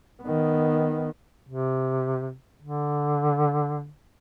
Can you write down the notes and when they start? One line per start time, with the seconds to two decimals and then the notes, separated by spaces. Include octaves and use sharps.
0.22 D#3 B3
1.47 C3
2.62 D3